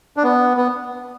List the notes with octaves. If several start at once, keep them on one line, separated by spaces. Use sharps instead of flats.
D4
B3
B3